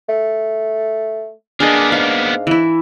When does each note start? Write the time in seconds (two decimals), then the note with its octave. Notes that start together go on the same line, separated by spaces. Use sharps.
0.09 A3
1.60 A#3 B3 D4 G#4 D#5
1.92 G#2 F5
2.47 E3 E4